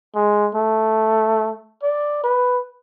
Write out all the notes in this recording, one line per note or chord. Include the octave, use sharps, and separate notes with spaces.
G#3
A3
D5
B4